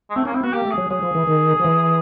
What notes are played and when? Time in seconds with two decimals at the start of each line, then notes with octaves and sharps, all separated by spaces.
0.10 G#3
0.15 A3 C4
0.25 A#3 C#4
0.34 C4 E4
0.44 B3 F#4
0.53 A#3 G4
0.65 A3
0.71 G#4
0.78 F#3
0.90 F#3 G#4
1.03 F3
1.15 E3
1.27 D#3
1.59 F3
1.64 E3